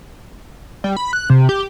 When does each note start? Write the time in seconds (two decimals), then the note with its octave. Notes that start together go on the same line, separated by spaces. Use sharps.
0.84 G3
0.97 B5
1.13 F#6
1.30 C3
1.49 G4